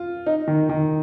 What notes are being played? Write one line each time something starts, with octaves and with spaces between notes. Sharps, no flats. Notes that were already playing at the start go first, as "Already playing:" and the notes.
Already playing: F4
D#4
D#3
D#3